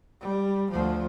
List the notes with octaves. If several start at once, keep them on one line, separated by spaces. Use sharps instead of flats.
G3
D2 F3